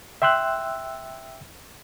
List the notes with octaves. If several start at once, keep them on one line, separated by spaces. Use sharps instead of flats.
E5 G5 C6 E6 F#6